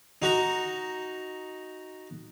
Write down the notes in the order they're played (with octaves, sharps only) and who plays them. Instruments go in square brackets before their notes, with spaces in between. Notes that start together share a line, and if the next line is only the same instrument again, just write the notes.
[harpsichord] D#4 F#4 A#5